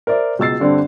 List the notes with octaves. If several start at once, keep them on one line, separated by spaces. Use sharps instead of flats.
A#4 C5 D5 E5
C#2 B2 E6 A6 C7
G2 D3 C4 D4